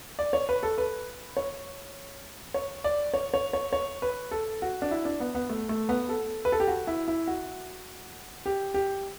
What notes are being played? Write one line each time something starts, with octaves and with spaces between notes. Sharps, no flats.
D5
C#5
B4
A4
B4
C#5
C#5
D5
C#5
C#5
C#5
C#5
B4
A4
F#4
D4
E4
D4
B3
B3
A3
A3
B3
A4
B4
A4
G4
F#4
E4
E4
F#4
G4
G4